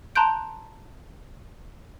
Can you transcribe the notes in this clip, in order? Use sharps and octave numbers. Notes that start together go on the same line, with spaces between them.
A5 A#5 C6 F#6 G6 D7